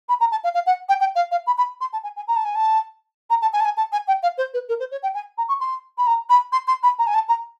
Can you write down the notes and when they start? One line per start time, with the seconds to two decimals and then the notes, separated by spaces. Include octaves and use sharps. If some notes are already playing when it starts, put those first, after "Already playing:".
0.09 B5
0.20 A#5
0.32 A5
0.44 F5
0.54 F5
0.66 F#5
0.89 G5
1.00 G5
1.15 F5
1.31 F5
1.47 B5
1.58 B5
1.81 C6
1.93 A5
2.04 G#5
2.16 G#5
2.28 A#5
2.36 A5
2.45 G#5
2.55 A5
3.30 A#5
3.42 A5
3.53 G#5
3.60 A5
3.65 G#5
3.77 A5
3.92 G#5
4.08 G5
4.23 F5
4.38 C5
4.54 B4
4.69 A#4
4.80 C5
4.91 C#5
5.03 G5
5.14 G#5
5.38 A#5
5.49 C#6
5.61 C6
5.98 B5
6.07 A#5
6.30 B5
6.52 C6
6.68 C6
6.83 B5
6.99 A#5
7.07 G#5
7.14 A5
7.29 A#5